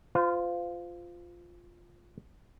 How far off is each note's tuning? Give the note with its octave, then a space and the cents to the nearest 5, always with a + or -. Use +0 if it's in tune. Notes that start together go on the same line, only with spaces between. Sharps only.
F4 +0 C5 -30